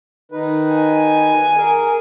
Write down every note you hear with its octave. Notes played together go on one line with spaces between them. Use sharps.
D#3 D#4 B4
G#5
G#4 A#4